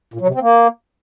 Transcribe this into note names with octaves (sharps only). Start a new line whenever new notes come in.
A#2
F#3
C3
C4
A#3